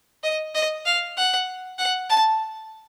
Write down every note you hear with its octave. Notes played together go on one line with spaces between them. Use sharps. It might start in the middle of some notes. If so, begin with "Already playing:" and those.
D#5
D#5
F5
F#5
F#5
A5